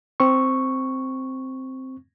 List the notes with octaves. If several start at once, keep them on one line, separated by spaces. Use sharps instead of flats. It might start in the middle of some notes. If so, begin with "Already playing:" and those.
C4 C#6